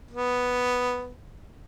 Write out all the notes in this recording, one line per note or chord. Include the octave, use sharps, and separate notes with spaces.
B3